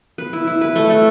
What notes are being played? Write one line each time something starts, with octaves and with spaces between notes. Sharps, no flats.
B4
E4
E4
B4
A3
A3